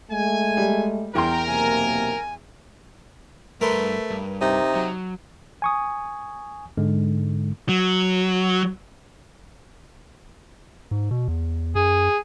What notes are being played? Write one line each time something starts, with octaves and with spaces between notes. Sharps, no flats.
G#3 A3 G#5
G3
E2 A#4 G5 C6
B1 C3 A#3 G#5
G2 A3 A#4 B4 C6
G2
C3 D#4
F#3
G#5 C#6 D#6
G#2 D3 G#3
F#3
G#2
B2
E2
F#2 G#4